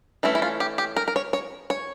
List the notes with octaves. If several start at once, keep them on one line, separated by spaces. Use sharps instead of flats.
E3 A3 C#4 E4
E4
F4
G4
G4
A#4
A#4
C#5
C#5
C#5